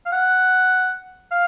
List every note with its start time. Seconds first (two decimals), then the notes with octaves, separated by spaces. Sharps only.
0.06 F5
0.12 F#5
1.31 F5